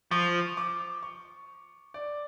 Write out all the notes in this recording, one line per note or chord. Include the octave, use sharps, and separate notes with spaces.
F3 C#6
D6
C#6
D5